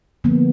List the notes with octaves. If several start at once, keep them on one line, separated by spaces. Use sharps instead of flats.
D3 F3 A#3 B3